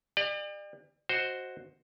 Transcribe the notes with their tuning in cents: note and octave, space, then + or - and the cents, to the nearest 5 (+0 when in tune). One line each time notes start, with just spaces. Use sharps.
G4 +40 D5 +40
F#4 +0 C5 +5 D#5 +0